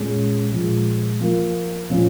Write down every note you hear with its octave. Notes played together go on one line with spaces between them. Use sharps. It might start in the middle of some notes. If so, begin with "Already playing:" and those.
Already playing: A#2 G#3 C#4
A#2 F3 G#3
F3 A#3 F4
A#2 F3 C#4 F4